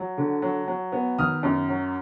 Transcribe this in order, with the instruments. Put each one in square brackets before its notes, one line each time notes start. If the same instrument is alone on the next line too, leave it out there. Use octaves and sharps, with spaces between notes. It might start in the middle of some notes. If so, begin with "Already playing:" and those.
Already playing: [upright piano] F#3
D3
F#3
F#3
B3
D#3 D#6 F6
F#2
F#3